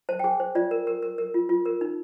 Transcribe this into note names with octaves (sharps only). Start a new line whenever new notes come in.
C5 A5
G5
G#4 G#5
C5
F4 D5
A#4
A#4
A#4
A#4
F4
F4
A#4
D#4